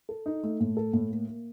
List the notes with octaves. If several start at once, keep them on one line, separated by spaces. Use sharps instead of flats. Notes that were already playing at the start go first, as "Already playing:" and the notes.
A4
D#4
A3
A2
A4
A2
A#3
A#3